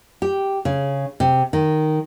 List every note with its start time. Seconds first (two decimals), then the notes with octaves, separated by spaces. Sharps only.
0.22 G4
0.65 C#3
1.20 C3
1.53 D#3